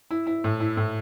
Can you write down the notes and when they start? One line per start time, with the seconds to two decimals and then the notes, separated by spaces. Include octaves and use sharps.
0.11 E4
0.27 E4
0.44 A2
0.60 E4
0.77 A2